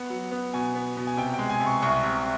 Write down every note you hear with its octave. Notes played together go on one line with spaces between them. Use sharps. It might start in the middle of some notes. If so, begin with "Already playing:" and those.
Already playing: B3 F#5
F#3
B3
B2 G#5
B3
B2
G#5
C3 G5
G5
G#3
G#5
C3
C#6
C2 C#6
C3